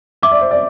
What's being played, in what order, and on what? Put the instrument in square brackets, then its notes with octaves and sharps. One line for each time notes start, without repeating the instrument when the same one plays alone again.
[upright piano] E5 [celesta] D6
[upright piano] D5
C5
D5